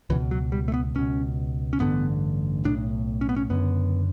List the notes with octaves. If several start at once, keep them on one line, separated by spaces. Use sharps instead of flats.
C#2 B2 E3
F#3
G3
A3
B3
C#2 B2 C#4
C#4
A1 G2 D3 B3
B1 A2 D4
C#4
B3
C#4
F#1 F#2 D3 B3